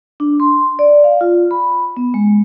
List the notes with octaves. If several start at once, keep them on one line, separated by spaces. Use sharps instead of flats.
D4
C6
D5
F5
F4
B5
B3
G#3